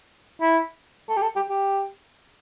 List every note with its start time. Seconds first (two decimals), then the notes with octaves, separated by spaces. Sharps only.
0.41 E4
1.09 A4
1.17 G4
1.23 A4
1.36 G4
1.50 G4